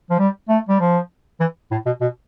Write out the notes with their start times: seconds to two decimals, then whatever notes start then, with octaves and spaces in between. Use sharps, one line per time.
0.10 F3
0.19 G3
0.49 A3
0.69 G3
0.80 F3
1.40 E3
1.71 A2
1.86 B2
2.01 B2